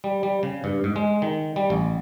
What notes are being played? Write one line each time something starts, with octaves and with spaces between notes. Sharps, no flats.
G3
G3
C#3
G2
G#2
G#3
D#3
G3
A1